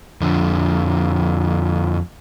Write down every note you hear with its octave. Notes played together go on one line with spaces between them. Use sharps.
F2 D3